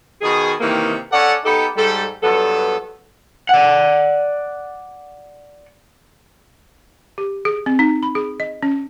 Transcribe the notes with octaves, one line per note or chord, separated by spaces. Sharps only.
B2 D#3 G#4
C3 D#3 E3 A#3 D#4
C#4 A4 D5 F#5
B3 D#4 G4 A4
G#2 G3 A4
G2 F#3 B3 A4
D5 F#5
G4
G#4
C4
D#4
B5
G#4
D#5
C#4